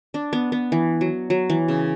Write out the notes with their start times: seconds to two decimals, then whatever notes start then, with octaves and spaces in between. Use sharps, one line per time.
0.14 D4
0.33 B3
0.52 B3
0.72 E3
1.01 F#3
1.30 F#3
1.50 E3
1.68 C#3